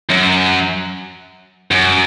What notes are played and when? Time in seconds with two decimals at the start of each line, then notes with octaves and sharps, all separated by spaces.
0.10 F#2
1.71 F#2